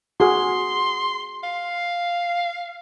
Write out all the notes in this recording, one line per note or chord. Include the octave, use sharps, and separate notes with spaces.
F#4 G#4 F#5 C6
F5